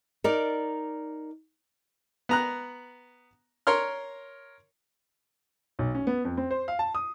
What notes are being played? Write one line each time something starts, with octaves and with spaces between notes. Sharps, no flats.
D#4 A#4 D5
B3 A#5 F#6
A#4 C#5 C6 F6
B1
C#4
B3
F2
C4
C5
F5
A5
D#6